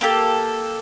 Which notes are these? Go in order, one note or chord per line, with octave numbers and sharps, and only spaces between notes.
A#3 G4 A4